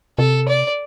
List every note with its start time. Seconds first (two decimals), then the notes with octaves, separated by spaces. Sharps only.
0.18 C3 A4
0.48 D5